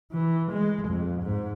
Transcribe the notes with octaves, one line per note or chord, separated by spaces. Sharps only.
E3
G#3
F2
G#2